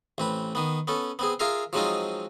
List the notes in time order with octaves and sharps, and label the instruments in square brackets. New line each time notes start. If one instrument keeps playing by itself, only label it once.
[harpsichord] A1 C4 B4
D#3 B3
B3 C#4 A4
B3 C4 G#4
F4 G#4 A#4 E5 F5
F3 F#3 G#3 C4 D#4 F4